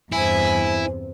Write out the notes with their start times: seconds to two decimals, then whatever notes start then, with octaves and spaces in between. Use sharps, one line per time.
0.12 E2 G2 C3 E4 G#5